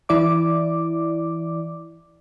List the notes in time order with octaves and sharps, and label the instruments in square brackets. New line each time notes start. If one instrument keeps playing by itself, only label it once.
[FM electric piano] E3 E4 D5 D6